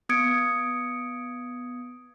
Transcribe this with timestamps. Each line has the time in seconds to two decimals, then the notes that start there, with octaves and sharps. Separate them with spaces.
0.09 B3 D#6 G#6 C#7 D7